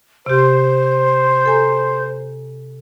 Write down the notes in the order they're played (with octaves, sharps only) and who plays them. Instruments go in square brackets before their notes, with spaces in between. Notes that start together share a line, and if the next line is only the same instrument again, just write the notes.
[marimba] C3 G4 [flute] C5
[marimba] A4 G#5 A#5